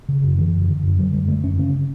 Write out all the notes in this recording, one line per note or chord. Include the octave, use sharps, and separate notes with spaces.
C#3
F#2
D3 E3
F#2
D3
F#2
D3 F#3
F#2 G3
D3 A3
F#2 C#4
C#3 C#4